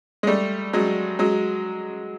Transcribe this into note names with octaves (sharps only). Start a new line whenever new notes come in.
G#3
G3 A3
F#3 G#3
F#3 G#3